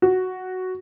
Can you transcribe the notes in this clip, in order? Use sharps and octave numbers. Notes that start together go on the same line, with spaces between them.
F#4